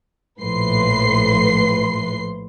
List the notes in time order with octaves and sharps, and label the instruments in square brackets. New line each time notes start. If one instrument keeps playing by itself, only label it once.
[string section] A#1 A2 F3 B4 C6 C7